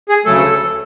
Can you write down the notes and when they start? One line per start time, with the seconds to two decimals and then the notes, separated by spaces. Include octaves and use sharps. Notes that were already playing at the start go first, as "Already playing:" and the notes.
0.09 G#4
0.25 D2 C#3 F#3 A3 A4